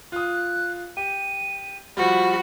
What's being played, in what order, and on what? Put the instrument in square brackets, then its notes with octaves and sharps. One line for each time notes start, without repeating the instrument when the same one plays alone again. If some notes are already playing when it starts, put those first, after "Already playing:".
[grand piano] F4 D#6 [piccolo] F#6
[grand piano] G4 [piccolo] D#7
[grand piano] F3 G3 [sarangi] F#4 [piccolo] B5